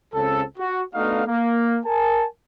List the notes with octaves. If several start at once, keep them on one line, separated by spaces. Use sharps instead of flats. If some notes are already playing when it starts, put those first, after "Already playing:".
C#2 C#3 C4 A4
F#4
A3 B3 D4 D#4 F#4 F5
A#3
A#4 G#5 A5